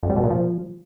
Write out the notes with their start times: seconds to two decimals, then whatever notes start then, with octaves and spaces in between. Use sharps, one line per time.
0.03 F2
0.10 G3
0.16 B2
0.23 A#2
0.30 F3